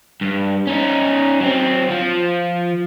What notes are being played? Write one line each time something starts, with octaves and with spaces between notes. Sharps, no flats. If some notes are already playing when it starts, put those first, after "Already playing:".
G2
C#4 D#4
F#3 C4
F3